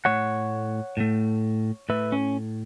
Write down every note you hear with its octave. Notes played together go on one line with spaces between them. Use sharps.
A2 A3 C#5 F#5
A2 A3
A2 A3 B4 E5
C#4